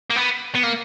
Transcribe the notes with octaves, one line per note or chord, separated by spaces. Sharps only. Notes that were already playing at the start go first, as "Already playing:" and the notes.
A#3
B3
B3
A#3